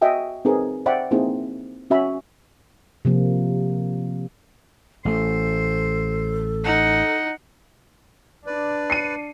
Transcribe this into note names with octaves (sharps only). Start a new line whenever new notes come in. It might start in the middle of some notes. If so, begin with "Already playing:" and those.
F#4 D#5 E5 G5 G#5
C4 D#4 G#4 A#4 B4
C5 D5 E5 F#5 G5 B5
A#3 C4 D#4 E4 G#4
C#4 F#4 E5 G#5 B5
C3 F3 A#3
A1 A3 A4 C5
D#4 F#5
D4 B4 D5
C7 C#7 D#7